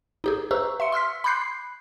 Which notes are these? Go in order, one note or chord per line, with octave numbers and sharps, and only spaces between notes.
D#4 G4 G#4
G4 B4 C5 A#5 C#6 E6
E5 C6 C#7
C6 E6 F6 B6
B5 C6 D6 F#6 G6 C7